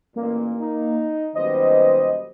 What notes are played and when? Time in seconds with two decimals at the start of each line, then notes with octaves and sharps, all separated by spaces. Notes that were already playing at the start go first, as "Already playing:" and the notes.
0.16 A1 A#2 A#3
0.59 D#4
1.35 F#2 A#2 D#3 G3 B3 C5 D#5